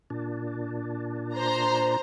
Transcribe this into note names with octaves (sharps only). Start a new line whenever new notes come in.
A#2 D4
C5 A#5